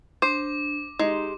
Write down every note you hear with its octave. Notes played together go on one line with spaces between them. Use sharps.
D4 C5 D6
G#3 D#4 G4 C6